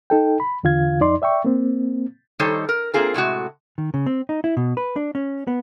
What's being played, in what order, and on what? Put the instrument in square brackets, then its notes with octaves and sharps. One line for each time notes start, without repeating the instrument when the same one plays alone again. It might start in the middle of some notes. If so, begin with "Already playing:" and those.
[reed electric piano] D#4 A4 G5
B5
E2 D3 F4 F5 G#6
F2 D#4 D5 C6
D5 E5 G5 C#6
A#3 C4
[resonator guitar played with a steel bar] D#3 G3 D#4 A4 C5 C#5
A#4
A#3 C4 F4 G#4 A#4
A2 C3 G#3 F#4
[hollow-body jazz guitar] D#3
C#3
C4
D#4
E4
B2
B4
D4
C#4
B3